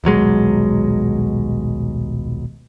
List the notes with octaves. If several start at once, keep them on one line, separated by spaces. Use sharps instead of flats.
D#1 B1 F#3 G#3